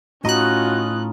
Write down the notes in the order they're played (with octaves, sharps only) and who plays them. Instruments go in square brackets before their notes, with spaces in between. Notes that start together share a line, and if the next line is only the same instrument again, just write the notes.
[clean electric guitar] A2 D#4 [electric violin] C#4 F4 [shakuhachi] F#4 [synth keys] D#5 F#6